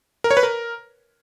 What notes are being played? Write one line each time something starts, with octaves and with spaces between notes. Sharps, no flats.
A#4
C#5
B4
A#4